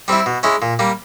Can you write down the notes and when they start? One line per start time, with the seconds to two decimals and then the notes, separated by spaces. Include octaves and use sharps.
0.08 G3 C4 E4
0.26 B2
0.43 G#3 C#4 E4
0.62 A#2
0.79 G3 A#3